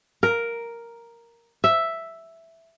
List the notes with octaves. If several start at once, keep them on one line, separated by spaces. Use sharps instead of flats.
A#4
E5